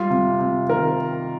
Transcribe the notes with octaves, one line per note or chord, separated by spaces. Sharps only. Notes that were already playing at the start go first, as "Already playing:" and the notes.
Already playing: G3 F4
C3
C3
D#3 A#4